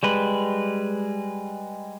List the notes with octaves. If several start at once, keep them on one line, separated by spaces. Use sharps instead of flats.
G3 G#3 B4